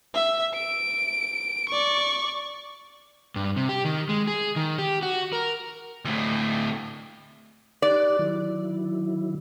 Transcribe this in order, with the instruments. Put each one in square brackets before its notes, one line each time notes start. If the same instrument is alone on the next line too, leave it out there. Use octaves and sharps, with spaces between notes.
[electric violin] E5
D7
D5 C#6
[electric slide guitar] G2
C3
G4
D#3
G#3
G#4
D#3
G4
F#4
A#4
[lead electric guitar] D2 A2
[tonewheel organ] D#4 G4 F#6 [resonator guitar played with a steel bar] D5
[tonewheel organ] D#3 F#3 E4